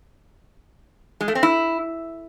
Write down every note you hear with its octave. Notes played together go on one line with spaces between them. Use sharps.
G#3
A3
C4
E4